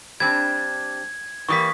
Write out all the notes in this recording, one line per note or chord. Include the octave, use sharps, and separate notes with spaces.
G3 C4 D4 G#6
E3 G3 A#3 C#6 D#6 B6